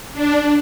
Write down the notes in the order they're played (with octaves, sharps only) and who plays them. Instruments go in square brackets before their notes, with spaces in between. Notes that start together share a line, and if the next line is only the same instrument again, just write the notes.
[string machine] D4